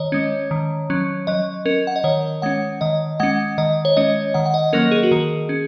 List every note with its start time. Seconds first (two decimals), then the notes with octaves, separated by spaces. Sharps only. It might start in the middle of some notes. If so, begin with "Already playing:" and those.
Already playing: D#3 C#5 D#5
0.12 G#3 C#4
0.51 D#3
0.90 F#3 C#4
1.27 F#3 D#5
1.66 C#4 A#4
1.87 F#5
1.96 D#5
2.04 D#3 C#5
2.42 G#3 C#4 F#5
2.81 D#3 D#5
3.20 G#3 C#4 F#5
3.58 D#3 D#5
3.85 C#5
3.97 G#3 C#4 D#5
4.34 D#3 F#5
4.46 F#5
4.54 D#5
4.73 F#3 A#3 C#4 A#4
4.91 G#4
5.03 F#4
5.12 D#3 G#4
5.49 C#4